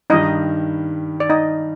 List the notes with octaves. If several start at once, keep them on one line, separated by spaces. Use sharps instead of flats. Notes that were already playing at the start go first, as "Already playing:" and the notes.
G2 D#3 G3 D#4 D#5
D5
D#4 D#5